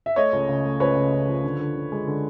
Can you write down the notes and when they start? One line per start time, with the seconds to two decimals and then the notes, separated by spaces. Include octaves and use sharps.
0.06 E5
0.16 A3 C#5 D#5
0.33 C#2
0.49 C#3
0.64 A3
0.80 C#2 B4 C#5
0.96 C#3
1.12 C#2
1.28 F3
1.44 D3
1.60 D3
1.76 D3
1.92 G#3
2.07 D3